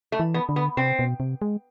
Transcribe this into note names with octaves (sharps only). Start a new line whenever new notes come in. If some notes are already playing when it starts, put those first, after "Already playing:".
A3
E3
B3
D3
B3
C3 C4
B2
C3
G#3